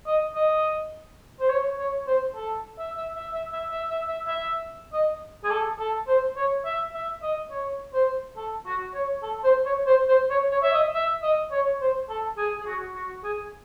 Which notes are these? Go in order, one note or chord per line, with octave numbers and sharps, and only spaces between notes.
D#5
D#5
C5
C#5
C#5
C5
A4
E5
E5
E5
E5
E5
E5
E5
E5
E5
D#5
G#4
A4
A4
C5
C#5
E5
E5
D#5
C#5
C5
A4
F#4
C#5
A4
C5
C#5
C5
C5
C#5
C#5
E5
D#5
E5
D#5
C#5
C5
A4
G#4
G#4
F#4
F#4
G#4